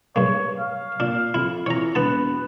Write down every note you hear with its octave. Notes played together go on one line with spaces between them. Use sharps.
G2 A#3 C#5
F5
A#2 D4
F2 E4
E3 C#5 A#5
E1 B3 B4 A5